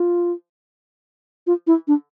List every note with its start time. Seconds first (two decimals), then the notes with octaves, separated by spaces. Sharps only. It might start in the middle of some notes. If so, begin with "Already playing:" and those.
Already playing: F4
1.47 F4
1.67 E4
1.87 D4